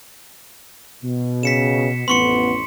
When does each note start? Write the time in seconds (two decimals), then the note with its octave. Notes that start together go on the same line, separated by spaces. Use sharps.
1.03 B2
1.43 C#3 B6 C#7 E7
2.08 A1 F2 B3 C6 C#6 C#7